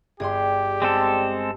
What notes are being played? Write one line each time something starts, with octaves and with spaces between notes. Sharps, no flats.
G1 G4 G#4 D5 G5 C6
G#3 C4 A4